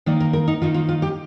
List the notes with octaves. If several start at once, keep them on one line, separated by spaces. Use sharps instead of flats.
D#3 A#3 D#4 D5
A#4
A#4
D#4
D#3 A#3 D#4 F4
F4
F4
G4